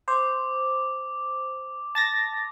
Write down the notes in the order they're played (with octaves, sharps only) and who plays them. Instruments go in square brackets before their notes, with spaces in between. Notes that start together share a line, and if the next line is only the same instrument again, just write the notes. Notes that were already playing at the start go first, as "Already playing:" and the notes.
[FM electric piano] C5 [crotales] D6
[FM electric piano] A5 A6 A#6